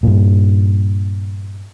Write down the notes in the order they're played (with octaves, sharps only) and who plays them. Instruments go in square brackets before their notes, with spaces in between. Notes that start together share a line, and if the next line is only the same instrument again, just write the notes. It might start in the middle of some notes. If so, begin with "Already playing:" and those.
[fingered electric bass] G2 A#2